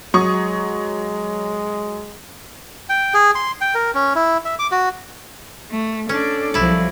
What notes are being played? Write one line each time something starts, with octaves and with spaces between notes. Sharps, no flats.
F#3 G#3 C#6 D#6
G5
G#4
C6
G5
A#4
C#4
E4
E5
D6
F#4
A3
C#4 D4 A4 D5
C2 F3 F#3 E4 D5